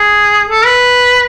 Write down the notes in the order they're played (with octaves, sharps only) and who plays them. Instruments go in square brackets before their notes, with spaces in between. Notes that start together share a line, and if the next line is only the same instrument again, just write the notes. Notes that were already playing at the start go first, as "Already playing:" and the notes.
Already playing: [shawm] G#4
A4
B4